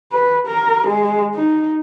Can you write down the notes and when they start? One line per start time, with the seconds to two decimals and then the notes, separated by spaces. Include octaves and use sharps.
0.12 B4
0.47 A#4
0.87 G#3
1.34 D#4